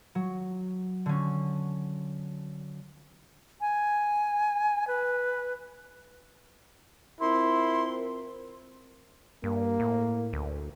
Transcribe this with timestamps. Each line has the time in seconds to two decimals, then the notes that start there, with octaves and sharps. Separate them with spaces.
0.15 F#3
1.06 D3 C#4
3.61 G#5
4.87 B4
7.20 C4 E4 F4 A#4 C6
9.44 G2 A#3
9.80 A2
10.33 D2